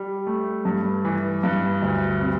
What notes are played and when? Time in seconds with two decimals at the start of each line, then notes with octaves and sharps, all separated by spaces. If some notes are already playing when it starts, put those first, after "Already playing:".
Already playing: G3
0.27 A3
0.65 G2
1.05 E3
1.43 G2
1.82 D2
2.21 C3